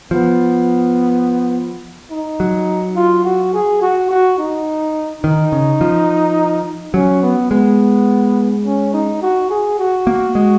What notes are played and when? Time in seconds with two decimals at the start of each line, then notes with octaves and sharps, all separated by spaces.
0.11 F3 B3
2.11 D#4
2.40 F#3
2.96 F4
3.24 F#4
3.53 G#4
3.81 F#4
4.10 F#4
4.38 D#4
5.24 D#3 D#4
5.52 C#3
5.81 F3
6.94 F#3 C#4
7.22 B3
7.51 G#3 B3
8.65 C#4
8.93 D#4
9.22 F#4
9.50 G#4
9.79 F#4
10.07 A#3
10.35 G#3